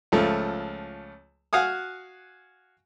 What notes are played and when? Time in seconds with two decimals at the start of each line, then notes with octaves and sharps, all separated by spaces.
0.12 C#2 F3 A3
1.53 F#4 F5 F#5 G#5 D#6